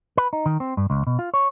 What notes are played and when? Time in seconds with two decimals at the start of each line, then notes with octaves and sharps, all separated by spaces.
0.17 B4
0.33 D#4
0.46 D#3
0.60 C4
0.77 G2
0.90 C#2
1.07 B2
1.19 F4
1.34 C#5